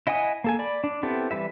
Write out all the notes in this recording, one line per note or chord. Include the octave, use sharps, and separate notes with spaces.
E4 D#5 F#5 G#5 D#6
A#3 A4 G#5
D5 B5
D4
B3 C4 E4 G4 A4
E3 G3 B4 E5